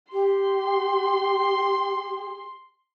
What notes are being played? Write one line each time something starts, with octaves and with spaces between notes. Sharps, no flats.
G4 C6